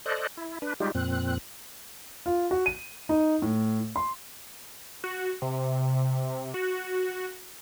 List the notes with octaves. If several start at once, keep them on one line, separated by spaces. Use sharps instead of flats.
A4 C5 D5 D#5 F#6
E4
D4 B4
G3 G#3 D#4 F4 G4
F2 A#2 C4 F#6
F4
F#4
D#7
D#4
A2
C6
F#4
C3
F#4